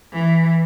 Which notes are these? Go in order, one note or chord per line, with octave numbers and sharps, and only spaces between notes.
E3